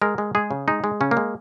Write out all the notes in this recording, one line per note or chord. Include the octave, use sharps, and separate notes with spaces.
G#3 A#4
G#3
G#3 G#4
C#3
G#3 D#4
G#3
C#3 C#4
A#3
G#3